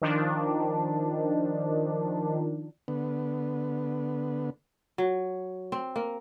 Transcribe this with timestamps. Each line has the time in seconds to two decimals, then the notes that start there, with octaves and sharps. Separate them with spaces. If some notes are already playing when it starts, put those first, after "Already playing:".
0.02 D#3 F3 D4
2.88 D3 B3
4.98 F#3
5.72 C4
5.96 A#3